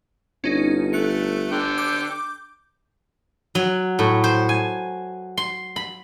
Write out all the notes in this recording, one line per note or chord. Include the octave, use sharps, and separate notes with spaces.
G1 C#4 D#4
A3 F#6 C#7
D3 G5
D6 G6
F#3
A2
C5
G#5
C6
B5